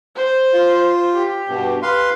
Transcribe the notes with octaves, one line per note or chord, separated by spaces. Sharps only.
C5
F4
G4
G2 B2
B4 F5 C6